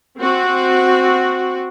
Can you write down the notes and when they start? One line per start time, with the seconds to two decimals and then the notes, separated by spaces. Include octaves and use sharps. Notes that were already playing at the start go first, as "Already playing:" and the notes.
0.17 C4 F#4